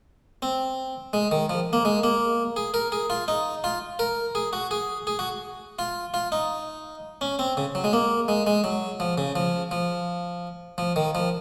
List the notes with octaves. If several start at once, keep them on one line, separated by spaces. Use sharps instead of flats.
C4
G#3
D#3
F3
A#3
G#3
A#3
G#4
A#4
G#4
F4
D#4
F4
A#4
G#4
F#4
G#4
G#4
F#4
F4
F4
D#4
C#4
C4
C#3
F#3
G#3
A#3
G#3
G#3
F#3
F3
C#3
F3
F3
F3
D#3
F3